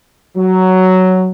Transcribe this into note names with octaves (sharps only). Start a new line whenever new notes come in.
F#3